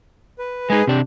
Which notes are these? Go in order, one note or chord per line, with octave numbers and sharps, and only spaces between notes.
B4
G#3 D#4 G#4 B4 G#5
C3 D4 G4